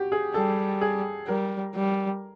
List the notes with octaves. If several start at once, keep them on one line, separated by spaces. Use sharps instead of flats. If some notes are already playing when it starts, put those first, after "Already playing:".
Already playing: F#4 G4
G#4
G3 A4
G#4
G3 A#4
G3